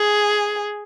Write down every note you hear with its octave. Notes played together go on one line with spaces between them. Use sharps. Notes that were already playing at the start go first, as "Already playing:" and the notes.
Already playing: G#4